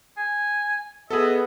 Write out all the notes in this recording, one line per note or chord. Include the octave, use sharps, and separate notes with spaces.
G#5
B3 G#4 A4 D#5 E5